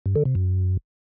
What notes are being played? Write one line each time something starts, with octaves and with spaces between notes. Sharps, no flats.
G2
D3
C3
F#2